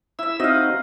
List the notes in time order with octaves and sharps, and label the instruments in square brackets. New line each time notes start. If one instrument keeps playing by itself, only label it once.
[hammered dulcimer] E4 E5 [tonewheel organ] E6
[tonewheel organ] C4 D#4 F#4 [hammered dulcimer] D#5 F5